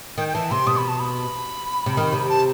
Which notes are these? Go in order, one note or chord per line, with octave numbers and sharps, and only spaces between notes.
D#3 G5
G5
E3 A5
C3 C6
B2 D#6
B5
A5
B5
C3
D#3
C3
A5